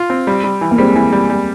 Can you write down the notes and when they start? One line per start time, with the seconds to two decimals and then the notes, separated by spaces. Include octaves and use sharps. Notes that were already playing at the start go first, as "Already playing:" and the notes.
Already playing: F4
0.10 C4
0.27 G3
0.44 G3
0.61 E3
0.71 A#3
0.78 G3 G#3 C4
0.96 E3
1.12 G3
1.30 G3